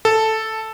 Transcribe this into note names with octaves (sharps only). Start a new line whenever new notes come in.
A4